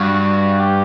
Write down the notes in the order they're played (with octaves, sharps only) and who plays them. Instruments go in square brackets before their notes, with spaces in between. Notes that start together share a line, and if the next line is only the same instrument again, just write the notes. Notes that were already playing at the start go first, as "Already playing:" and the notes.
Already playing: [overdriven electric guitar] G2 [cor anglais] F#4
[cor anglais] G4